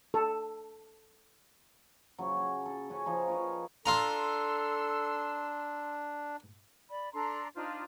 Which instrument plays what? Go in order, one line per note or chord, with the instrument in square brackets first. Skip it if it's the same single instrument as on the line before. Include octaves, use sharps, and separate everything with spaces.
[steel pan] A4
[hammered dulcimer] C#3 F#3
G#4
A4
C#4 F#5 G#5
F3 D#4 G#4 C5
A#4 B4 C#5
[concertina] D4 [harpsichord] F4 F5 A#5 [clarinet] A4 [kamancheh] C6 E6
[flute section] D5 B5
D4 A4 A#5 C6
D4 D#4 F4 C5